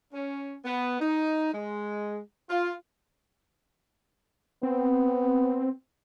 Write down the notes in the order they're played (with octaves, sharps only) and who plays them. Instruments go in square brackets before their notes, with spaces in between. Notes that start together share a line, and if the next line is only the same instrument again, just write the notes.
[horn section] C#4
B3
D#4
G#3
F4
[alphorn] B3 [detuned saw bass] C4